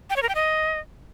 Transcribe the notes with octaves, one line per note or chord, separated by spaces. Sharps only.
G5
C#5
A#4
G5
D#5